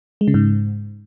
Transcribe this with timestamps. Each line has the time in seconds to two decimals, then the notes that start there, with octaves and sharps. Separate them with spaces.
0.21 G#3
0.28 C#3
0.34 G#2